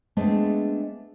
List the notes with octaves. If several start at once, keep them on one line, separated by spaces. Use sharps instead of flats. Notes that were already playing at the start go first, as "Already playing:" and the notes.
G#3 A3 B3 C4 D4 G#4